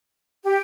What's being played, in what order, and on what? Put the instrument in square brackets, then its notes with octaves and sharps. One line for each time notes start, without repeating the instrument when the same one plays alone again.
[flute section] G4